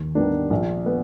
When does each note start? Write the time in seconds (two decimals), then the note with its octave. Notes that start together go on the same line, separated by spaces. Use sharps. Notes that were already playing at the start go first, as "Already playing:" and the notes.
Already playing: D#2
0.15 D#3 G3 B3 D4
0.50 A#1
0.86 B3